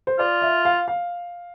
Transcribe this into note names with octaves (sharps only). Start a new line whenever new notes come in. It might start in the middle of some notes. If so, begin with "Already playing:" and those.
C5
F4 D5
E5
F5
F5